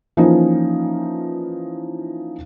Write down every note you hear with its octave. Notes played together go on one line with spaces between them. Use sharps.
E3 F3 A#3 C#4 D#4 F4